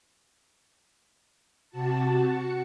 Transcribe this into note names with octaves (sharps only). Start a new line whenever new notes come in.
C3 F#4 A5
F#4 C#7